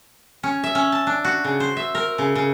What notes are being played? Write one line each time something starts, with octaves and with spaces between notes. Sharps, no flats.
C#4
E5
C#4
A5
D4
F#4
C#3
C5
E5
A#4
C#3
C#3